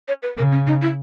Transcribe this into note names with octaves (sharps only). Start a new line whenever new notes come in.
C#5
B4
C#3 A#4
C#4
D#4
E4